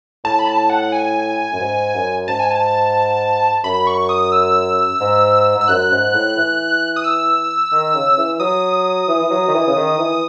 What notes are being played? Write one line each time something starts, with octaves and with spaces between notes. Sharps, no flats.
A2 A5
B5
A5
F#5
G#5
F#2
G#2
F#2
G#2 A5
G#5
A5
F#2 B5
C#6
D#6
E6
G#2
G#2 E6
F#2 F#6
G#2
A2
E3
D#6
E6
D#3
C#3
E3
F#3 D#6
E3
E3
F#3
D#3
E3
C#3
D#3
E3